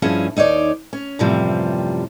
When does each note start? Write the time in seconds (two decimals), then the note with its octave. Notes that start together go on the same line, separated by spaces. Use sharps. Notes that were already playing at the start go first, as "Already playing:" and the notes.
0.02 G2 F3 C#4 E4 G#4
0.36 D#2 D#4 C#5 D5
0.93 C#4
1.19 F#2 A2 C3 E3 F3 G3